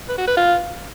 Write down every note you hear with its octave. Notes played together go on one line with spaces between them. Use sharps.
B4
F#4
B4
F4